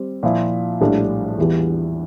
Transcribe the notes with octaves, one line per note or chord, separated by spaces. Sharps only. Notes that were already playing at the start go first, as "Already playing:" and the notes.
Already playing: G3 C4
A#2 F3 A#3 E4
A#1 A2 G3 D4
E2 E3 G3